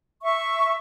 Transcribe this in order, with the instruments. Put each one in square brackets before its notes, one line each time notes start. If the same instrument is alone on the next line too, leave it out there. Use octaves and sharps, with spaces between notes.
[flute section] E5 C#6